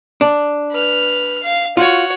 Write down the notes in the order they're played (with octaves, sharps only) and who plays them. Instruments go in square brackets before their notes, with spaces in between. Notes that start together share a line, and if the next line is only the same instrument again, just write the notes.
[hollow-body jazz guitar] D4
[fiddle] B4 F6
F5
[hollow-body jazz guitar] F4 [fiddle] F#4 C#5